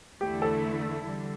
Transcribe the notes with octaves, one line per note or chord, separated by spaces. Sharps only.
E2 D3 A3 E4 G4
A4
D3 G3